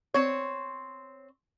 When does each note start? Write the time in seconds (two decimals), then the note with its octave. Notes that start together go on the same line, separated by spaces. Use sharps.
0.14 C4 C#5